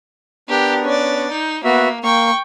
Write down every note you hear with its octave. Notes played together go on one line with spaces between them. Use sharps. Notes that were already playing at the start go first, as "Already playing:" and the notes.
B3 D4 G4 A#4
C#4 D5
D#4 G6
A#3 B3 F#4 E5
A#3 G5 C#6